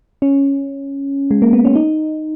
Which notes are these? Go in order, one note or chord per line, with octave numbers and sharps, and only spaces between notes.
C#4
G#3
A#3
B3
C#4
D#4